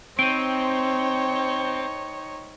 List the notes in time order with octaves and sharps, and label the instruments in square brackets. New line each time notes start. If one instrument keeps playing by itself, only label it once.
[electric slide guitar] C4 [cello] D#4 C#5 [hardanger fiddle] C5 G5 [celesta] D7 D#7